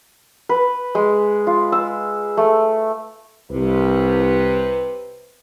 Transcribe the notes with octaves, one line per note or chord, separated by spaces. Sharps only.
B4
G#3
F4
E6
A3
C2 C3 B4